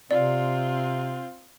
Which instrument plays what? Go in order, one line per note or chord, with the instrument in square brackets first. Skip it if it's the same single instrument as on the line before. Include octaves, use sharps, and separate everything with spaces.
[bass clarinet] C3 [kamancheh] C4 F4 [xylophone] D5